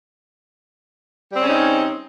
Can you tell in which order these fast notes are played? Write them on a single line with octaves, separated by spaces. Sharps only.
G3 C4 C#3 C#4 D#4